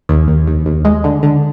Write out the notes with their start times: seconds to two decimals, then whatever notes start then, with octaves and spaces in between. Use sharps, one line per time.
0.09 D#2
0.28 D#2
0.48 D#2
0.66 D#2
0.85 G#3
1.04 D3
1.23 D3